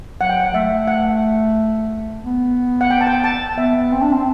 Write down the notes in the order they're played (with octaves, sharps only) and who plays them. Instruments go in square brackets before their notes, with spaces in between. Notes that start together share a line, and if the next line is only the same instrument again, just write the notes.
[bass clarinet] F#3 [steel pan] F#5
[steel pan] G5
F#5
[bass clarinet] A3 [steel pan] E5
[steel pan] F#5
[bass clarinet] B3
[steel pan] F#5
G5
A5
G5
A5
[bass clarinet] B3 [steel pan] E5
[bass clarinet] C4
D4
C4